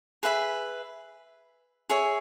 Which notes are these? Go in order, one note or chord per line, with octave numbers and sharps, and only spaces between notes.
G#4 B4 E5 B5
G#4 C#5 E5